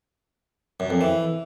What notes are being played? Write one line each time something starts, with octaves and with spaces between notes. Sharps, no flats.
F#2
F2
E3